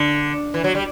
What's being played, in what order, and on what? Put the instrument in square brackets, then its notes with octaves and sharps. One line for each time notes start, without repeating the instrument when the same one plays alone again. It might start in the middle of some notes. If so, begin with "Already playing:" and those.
Already playing: [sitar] D3
E3
F#3
G3